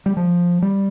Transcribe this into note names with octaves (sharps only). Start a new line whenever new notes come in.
G3
F3
G3